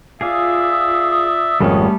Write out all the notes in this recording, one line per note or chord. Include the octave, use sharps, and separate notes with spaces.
F4 G#4 D5 E5 F5 D#6
G#1 F2 G3 A3 B3 C#4 A4 C#5